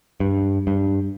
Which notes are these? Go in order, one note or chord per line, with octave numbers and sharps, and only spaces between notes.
G2
G2